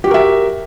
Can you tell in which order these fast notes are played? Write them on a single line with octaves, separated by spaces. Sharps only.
G4 F#4 A#4 E5